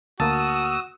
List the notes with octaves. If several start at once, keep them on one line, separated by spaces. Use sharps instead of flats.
D2 A#3 F#4 A5 D#6 E6